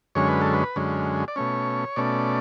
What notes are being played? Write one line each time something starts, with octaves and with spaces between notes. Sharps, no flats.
F#2 D3 G#3 C#4 C#5
B4
A4
B4
F#2 D3 G#3 C#4
D5
B2 A3 C#4 C#5
B2 A3 C#4 D5